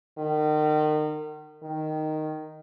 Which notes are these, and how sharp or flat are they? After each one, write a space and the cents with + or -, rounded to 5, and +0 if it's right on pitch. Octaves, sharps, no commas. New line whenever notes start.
D#3 -35
D#3 -5